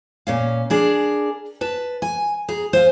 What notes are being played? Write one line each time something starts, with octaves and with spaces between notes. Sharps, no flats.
A#2 C#4 F5
D4 G#4 A#4
B4 A5
G#5
G#4 A#5
C5 F5 G#5